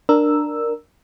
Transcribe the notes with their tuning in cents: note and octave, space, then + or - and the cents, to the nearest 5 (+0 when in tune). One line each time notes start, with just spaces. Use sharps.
D4 +15 A#4 +0 E6 +0